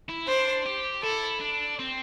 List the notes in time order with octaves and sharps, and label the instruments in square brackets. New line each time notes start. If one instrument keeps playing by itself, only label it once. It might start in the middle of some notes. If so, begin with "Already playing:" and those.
[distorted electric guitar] E4
[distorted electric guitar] D4 [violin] C5
[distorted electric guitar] G4
[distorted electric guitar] E4 [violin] A4
[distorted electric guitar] D4
C4